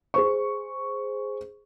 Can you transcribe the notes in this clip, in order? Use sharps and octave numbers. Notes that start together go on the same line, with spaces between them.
G#4 C5 C#6